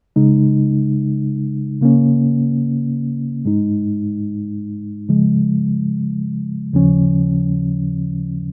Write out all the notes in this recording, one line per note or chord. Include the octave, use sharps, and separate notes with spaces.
C#3 G#3 D#4
C#3 A#3 C#4
G#2 G#3 D#4
C#3 F3 G#3
D#2 C#3 F3 C#4